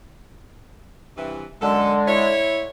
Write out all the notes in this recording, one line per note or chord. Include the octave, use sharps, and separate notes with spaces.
G2 C3 E3
F#2 D3 G#3 A4
E4 C#5